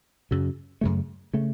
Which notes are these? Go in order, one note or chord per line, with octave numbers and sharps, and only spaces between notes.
F#2 C#3 F#3
F#2 C#3 A3
C#3 A3